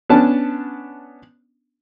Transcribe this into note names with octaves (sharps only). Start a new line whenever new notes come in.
B3 C#4 D4 A5